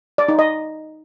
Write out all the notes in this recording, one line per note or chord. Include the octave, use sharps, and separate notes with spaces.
D5
D#4
D#5